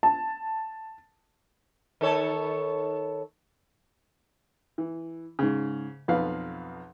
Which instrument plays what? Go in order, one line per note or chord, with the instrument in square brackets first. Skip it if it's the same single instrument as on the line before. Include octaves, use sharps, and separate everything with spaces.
[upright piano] A5
[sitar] D#3 A4 C#5
[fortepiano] E3
G#2 C#3
B1 F2 B4 F5